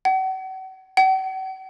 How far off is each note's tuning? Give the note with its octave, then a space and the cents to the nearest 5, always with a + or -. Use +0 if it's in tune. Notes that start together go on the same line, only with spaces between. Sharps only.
F#5 +40
F#5 +45